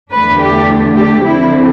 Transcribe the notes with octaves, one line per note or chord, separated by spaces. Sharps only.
E2 D3 A3 D4 B4
G4
G4
D3 F3 C4 E4